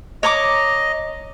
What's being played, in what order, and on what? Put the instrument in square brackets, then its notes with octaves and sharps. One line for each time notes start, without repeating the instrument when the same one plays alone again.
[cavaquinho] C#5 A#5 D6 [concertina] D#5